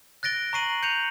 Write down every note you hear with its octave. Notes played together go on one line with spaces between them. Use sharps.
F#6 A6 A#6 D7 G7
A#5 C#6 C7 D#7 F#7
G6 C#7 D#7 F7